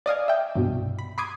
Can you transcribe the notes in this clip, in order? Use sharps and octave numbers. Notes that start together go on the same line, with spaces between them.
D5 D#5 F5 G#5
E5 G5
C2 G2 B2
B5
B5 C6 D6 D#6 G#6